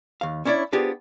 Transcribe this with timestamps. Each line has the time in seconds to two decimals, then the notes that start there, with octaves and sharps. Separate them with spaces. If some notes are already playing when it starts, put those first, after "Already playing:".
0.21 D#2 F5
0.45 C#4 D4 E4 C#5 D5
0.73 B3 D4 F4 G4 G#4 C5